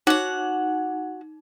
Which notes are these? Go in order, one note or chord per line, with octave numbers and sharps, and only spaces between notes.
D#4 F#4 F#5